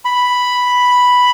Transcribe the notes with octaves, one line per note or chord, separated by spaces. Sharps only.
B5